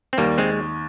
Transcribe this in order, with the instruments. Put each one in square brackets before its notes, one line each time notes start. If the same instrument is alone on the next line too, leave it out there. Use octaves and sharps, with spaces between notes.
[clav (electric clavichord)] C4
[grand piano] D#2 [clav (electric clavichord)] G3 A#3
[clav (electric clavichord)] G#3 C4